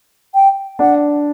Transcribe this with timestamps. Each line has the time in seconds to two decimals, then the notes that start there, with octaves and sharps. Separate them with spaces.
0.35 G5
0.79 D4 F#5